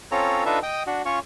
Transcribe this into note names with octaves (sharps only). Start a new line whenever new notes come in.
C4 C#4 F4 A4 C#5 A#5
D4 D#4 F4 A4 B4 E5
D#5 G5 D#6
D4 F#4
C#4 F4 C#5 C#6